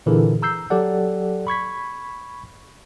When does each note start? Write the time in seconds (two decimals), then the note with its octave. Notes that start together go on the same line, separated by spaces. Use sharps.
0.06 A#2 D3 E3 E4 G#4 A#4
0.42 A#5 E6 G6 C7
0.70 F#3 G4 A4 D5 F#5
1.47 B5 C#6 G#6 B6